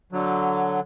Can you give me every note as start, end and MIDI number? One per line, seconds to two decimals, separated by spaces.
0.12 0.80 50
0.12 0.80 54